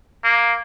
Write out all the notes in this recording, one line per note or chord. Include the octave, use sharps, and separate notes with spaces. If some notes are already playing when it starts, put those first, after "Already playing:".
A#3